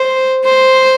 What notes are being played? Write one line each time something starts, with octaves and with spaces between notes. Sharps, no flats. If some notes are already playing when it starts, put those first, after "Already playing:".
Already playing: C5
C5